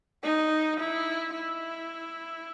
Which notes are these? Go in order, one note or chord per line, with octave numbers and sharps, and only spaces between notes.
D#4
E4
E4